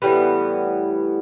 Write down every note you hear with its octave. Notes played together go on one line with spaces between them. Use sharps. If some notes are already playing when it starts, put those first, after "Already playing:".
A2 E3 G3 B3